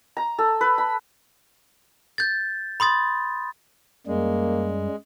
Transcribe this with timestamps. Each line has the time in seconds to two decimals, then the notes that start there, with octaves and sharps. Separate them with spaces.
0.17 A#5
0.39 A4
0.61 B4
0.78 B5
2.18 G6 A6
2.80 B5 C6 D#6 A6
4.07 F#2 G3 G#3 A#3